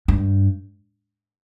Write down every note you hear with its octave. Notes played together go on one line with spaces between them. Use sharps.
G2